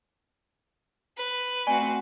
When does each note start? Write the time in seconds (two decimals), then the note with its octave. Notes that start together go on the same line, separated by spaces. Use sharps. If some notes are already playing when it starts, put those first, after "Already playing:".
1.17 B4
1.67 A3 C4 F#4 D5 G#5 C#6